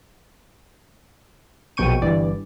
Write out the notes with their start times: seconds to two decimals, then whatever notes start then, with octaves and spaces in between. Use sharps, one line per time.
1.77 A#1 B2 G5 C#6 D#7
2.02 G1 G2 E3 D5